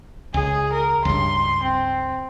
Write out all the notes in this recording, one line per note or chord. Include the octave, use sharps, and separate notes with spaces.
C#2 G#4
A#4
C#2 G2 C6
C4